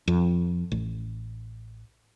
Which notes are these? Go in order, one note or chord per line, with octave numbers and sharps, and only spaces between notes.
F2
A1